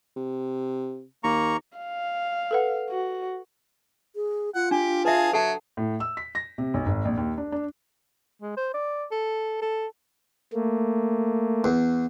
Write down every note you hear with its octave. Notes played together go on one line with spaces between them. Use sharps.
C3
D#2 A#3 A#5 C#6
F5
A4 B4 F#5
F#4
G#4
F4 F#5
D4 G4
G#4 B4 E5 F5 A5
F#3 A4 E5 F#5 A5
A2
E6
B6
A#6
C3
B1
G#1
A#1
D#2
D4
D4
G#3
C5
D5
A4
A4
A3 A#3
E2